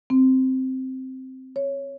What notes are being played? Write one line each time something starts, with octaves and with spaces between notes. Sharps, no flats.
C4
C#5